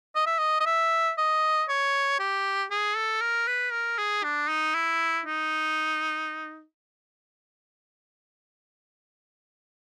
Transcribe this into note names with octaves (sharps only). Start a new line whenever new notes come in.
D#5
E5
D#5
D#5
E5
D#5
C#5
G4
G#4
A4
A#4
B4
A#4
G#4
D4
D#4
E4
D#4